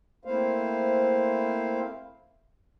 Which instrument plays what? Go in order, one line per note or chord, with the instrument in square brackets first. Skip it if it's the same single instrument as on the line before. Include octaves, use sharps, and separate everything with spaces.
[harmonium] A3 A#3 C4 E4 C5 F5